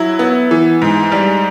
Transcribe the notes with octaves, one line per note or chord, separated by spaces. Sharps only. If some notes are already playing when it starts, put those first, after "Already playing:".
Already playing: F#3 E4
B3
E3
G#2
G3